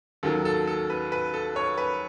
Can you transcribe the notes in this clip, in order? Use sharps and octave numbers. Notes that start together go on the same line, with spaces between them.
D#2 D#3 F#3 A4
A4
A4
B4
B4
A4
C#5
B4